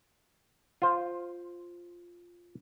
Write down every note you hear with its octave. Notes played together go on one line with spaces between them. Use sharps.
F4 C5